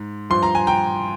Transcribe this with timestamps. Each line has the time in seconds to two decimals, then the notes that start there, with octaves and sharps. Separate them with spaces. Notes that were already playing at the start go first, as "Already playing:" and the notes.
Already playing: G#2
0.30 G2 F3 C6
0.43 A#5
0.55 G#5
0.67 G5 A#5